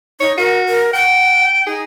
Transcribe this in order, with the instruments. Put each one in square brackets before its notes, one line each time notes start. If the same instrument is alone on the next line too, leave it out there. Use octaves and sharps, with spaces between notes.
[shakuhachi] D#4 [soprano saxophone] C#5
[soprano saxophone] F#4 [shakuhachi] A#4
[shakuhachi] A#4
[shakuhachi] F#5 [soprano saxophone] G5
[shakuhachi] D#4 [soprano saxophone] G#4